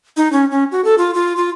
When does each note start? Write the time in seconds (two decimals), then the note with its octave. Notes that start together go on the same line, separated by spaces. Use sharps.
0.17 D#4
0.32 C#4
0.51 C#4
0.72 F#4
0.84 A4
0.98 F4
1.14 F4
1.37 F4